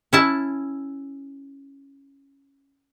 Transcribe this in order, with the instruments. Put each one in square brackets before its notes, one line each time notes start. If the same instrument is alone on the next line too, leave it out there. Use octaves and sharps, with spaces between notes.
[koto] C#4 E4 A5